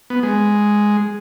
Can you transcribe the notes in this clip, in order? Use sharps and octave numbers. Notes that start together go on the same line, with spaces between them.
B3
G#3